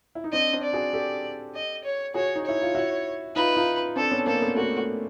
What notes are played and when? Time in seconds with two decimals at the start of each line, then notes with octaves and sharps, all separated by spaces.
0.15 E4
0.24 D#4
0.33 C4 D4 D#5
0.53 C4 D4
0.63 D5
0.73 F#4 G#4
0.93 G4 A4
1.55 D#5
1.84 C#5
2.14 F#4 G#4 C#5
2.36 D#4
2.45 E4 C#5
2.62 F4
2.75 E4 F#4
3.35 D#4 F4 B4
3.56 D#4 F4
3.96 C4 D4 A4
4.11 B3 C#4
4.26 A#3 C4 A4
4.42 A3 B3
4.56 A3 F#4
4.78 A3